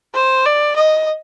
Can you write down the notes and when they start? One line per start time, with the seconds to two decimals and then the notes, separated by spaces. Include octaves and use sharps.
0.15 C5
0.46 D5
0.76 D#5